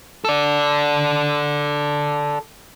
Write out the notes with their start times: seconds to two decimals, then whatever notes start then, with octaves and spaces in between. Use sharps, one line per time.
0.25 A4 D5